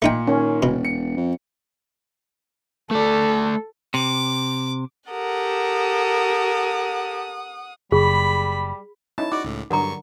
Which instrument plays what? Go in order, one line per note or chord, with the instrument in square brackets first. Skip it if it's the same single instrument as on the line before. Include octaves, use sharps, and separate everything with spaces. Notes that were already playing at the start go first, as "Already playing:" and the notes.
[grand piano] A#2 C#7 [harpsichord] A3 D#4 G5
[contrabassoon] D#3 [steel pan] C#4
[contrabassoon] E1 [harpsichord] B2
[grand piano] C#7
[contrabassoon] F2
[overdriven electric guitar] A3 D5 [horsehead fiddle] A4
[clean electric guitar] C3 [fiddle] D6
[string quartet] G4 A4 A#4 [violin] F#5 D#6
[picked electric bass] F#1 [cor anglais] G3 [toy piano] G#4 [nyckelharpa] B5
[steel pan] C#4 D#4 E4 [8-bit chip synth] A5
[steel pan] D#4 [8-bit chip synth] F#4 D5 [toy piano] D6
[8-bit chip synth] C#2 A2
[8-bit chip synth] G2 C#6 [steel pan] D3 F#3 A#4 [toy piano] F#5 A#5